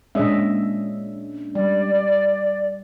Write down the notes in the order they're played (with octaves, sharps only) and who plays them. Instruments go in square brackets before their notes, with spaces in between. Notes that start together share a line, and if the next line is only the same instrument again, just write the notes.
[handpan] A#2 D#5 E5 [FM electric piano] G#3 C#4 D4
[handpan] G3 [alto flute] D5